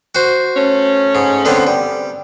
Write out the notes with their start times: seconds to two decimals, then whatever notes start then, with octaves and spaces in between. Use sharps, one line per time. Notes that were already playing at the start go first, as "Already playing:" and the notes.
0.15 F#4 C5
0.56 A3 C#4
1.15 G#2
1.45 D3 B3 C4
1.67 G3